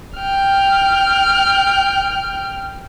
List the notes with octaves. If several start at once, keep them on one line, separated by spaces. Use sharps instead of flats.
G5 F6